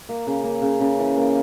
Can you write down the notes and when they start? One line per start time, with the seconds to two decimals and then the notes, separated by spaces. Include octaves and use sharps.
0.09 A#3
0.27 C#3
0.44 A#3
0.62 C#3
0.80 C#3
0.99 E3
1.17 A#3